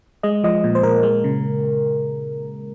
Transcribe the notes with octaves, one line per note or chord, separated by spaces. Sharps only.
G#3 D#5
F3 D#5
A#2
C5
A#2 A#4
G#3
C#3